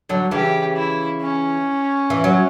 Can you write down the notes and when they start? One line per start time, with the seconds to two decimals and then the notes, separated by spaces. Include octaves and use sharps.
0.09 D3 F#3
0.31 C#3 E3 G4
0.77 E4
1.21 C#4
2.10 E3
2.24 F#3